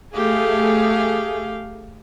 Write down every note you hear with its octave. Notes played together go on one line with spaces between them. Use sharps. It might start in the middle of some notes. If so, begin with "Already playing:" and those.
A3 G4 G#4 F5